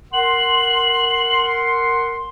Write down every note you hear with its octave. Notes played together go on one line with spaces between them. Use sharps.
A#4 F#5 C6 F#7